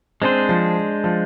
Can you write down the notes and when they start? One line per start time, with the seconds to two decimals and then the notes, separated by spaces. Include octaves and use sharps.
0.22 G#3 C4 D4 G#4 C5
0.49 F3
1.04 F3